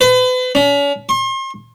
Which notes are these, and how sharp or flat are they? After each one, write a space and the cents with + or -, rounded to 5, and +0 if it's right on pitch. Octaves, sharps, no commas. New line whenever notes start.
B4 +40
C#4 +40
C6 +40